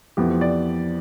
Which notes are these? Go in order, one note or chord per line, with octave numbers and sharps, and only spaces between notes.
F2 E3 B3 G4
C5
D5